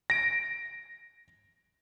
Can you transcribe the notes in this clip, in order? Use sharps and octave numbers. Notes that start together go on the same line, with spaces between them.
A#6 D7